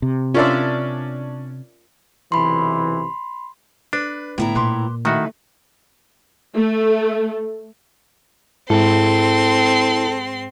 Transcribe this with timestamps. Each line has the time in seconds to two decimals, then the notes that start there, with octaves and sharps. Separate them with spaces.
0.02 C3
0.34 C#4 D4 F4 A#4 D5 E5
2.32 B1 C3 E3 B5 C6
3.93 D4 B4
4.38 A2 D3 B3 E4 A#5
4.55 A#2 B4 C6 D6
5.05 D#3 A3 D#4 E4 F#4 B4
6.54 A3
8.70 G#2 C4 E4 A4 C6